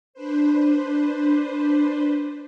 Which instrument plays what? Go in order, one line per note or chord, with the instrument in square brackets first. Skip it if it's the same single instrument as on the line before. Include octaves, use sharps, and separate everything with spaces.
[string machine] D4 B4 C5